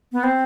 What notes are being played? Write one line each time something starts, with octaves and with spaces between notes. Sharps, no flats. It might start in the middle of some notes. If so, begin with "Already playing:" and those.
B3
C4